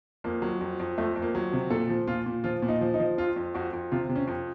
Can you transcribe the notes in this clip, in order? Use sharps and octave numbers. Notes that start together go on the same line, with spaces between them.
F2 A#3
F#3
F2
F2
F2 A3
F2
A#3
F#3
C3
A#2 A4
F3
A#2 F4
A#2
F3 F4
A#2
D#4
F3
D#4
F3
F2 F4
F2
F2 F#4
F2
C3 F4
C3
C#4
F2